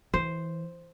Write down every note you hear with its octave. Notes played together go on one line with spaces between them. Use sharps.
E3 C5